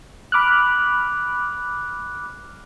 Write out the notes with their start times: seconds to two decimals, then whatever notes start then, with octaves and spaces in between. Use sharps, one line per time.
0.32 B5 D6 F6 F#6